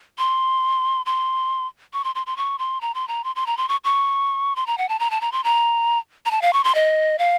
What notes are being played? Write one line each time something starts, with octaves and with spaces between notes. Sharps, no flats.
C6
C6
C#6
C6
C6
C6
C#6
C6
A#5
C6
A#5
C6
C6
A#5
C6
C#6
C#6
C6
A#5
F#5
A5
A#5
A5
A#5
C6
A#5
A#5
A5
F5
C#6
C6
D#5
F5